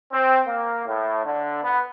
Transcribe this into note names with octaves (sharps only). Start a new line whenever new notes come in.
C4
A#3
A2
D3
B3